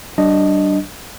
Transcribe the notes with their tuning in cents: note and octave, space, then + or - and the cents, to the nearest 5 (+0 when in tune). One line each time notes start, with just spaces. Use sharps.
G3 -40 D4 +0 D#5 +0